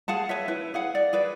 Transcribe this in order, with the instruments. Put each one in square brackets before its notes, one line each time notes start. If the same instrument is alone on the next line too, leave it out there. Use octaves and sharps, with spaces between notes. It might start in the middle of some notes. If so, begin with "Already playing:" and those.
[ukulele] G#4 F5 F#5 A5
B4 C#5 E5
E4 B4
G#4 F5 F#5
D5
G#4 B4 D5